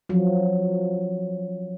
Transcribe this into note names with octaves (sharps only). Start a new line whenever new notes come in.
F3 F#3